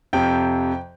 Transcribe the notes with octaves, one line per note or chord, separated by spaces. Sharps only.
F2 C3 F3 G5